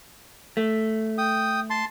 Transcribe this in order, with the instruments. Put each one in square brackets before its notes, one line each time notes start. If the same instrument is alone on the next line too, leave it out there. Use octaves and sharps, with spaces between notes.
[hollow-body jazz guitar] A3
[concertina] G5 D#6
A5 C6